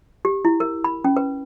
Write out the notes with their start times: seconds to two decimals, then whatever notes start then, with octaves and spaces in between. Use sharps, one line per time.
0.25 G4
0.45 E4
0.60 A#4
0.84 B5
1.04 C#4
1.17 B4